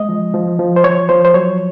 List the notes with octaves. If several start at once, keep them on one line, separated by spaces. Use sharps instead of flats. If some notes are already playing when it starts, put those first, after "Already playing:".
Already playing: G#3 D#5
F3
F3
F3
C5
F3 C#5
F3 C5
C5
F#3 C#5